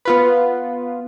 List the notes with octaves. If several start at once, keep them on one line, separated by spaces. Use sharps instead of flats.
B3 F4 B4